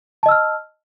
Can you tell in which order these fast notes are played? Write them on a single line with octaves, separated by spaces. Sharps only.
A5 D#5 E6 F6